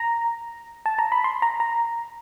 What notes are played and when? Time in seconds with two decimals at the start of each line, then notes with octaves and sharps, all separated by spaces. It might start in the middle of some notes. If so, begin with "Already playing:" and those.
Already playing: A#5
0.86 A5
0.99 A#5
1.12 B5
1.24 C6
1.42 A#5
1.60 A#5